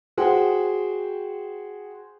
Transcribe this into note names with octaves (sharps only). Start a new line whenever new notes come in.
F#4 G#4 C5 F#5 G5